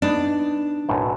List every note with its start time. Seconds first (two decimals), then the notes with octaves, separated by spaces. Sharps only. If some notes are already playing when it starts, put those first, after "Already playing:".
0.02 B3 D4 D#4
0.89 B1 F#2 A2